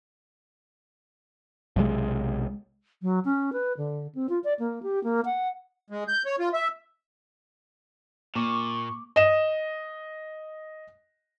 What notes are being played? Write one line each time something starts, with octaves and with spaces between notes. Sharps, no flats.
B1 C3 D#3 G#3
F#3
C#4
B4
D3
C4
F4
D5
A#3
G4
A#3
F#5
G#3
G6
C#5
F4
E5
A#2 A#3 C#6 D6
D#5 E7